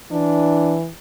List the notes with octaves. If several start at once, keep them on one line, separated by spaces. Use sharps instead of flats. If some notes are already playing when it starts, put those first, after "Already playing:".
E3 D4